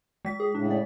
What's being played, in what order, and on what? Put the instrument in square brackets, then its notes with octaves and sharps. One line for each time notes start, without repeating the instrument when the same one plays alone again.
[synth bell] G#3 B6
[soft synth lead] G#4
[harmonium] A2 C#3 [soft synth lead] D4
[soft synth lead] D5